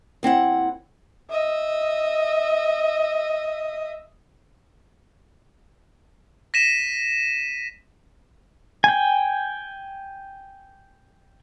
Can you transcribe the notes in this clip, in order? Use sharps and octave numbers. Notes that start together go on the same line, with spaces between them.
D#2 C4 E4 F#5
D#5 E5
A#6 B6 D#7 E7
G5 G#5